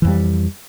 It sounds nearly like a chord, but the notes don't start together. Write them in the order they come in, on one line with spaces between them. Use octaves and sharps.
E3 F2 G3